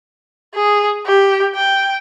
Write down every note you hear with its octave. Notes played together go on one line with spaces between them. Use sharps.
G#4
G4
G5